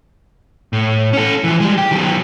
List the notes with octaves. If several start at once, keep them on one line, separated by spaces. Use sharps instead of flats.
A2
C#4 A4
E3 F3
G3 G#3
G4
D#3 F#3